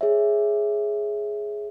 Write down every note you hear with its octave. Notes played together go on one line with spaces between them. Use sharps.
G#4 C#5 E5